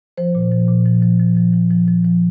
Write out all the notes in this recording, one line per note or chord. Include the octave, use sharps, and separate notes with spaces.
F3 C5
A#2
F3
A#2
F3
F3
F3
F3
F3
F3
F3
F3